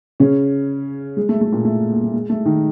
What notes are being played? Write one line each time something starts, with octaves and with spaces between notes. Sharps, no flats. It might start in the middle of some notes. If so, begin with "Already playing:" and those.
C#3 C#4
G#3
A3
A3
A#2 A#3
A3
A#3
A3
G#3
A3
D#3 D#4